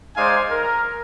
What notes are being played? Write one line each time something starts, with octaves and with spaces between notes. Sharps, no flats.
G#3 D#4 C5 D5 F5 G#5
A#4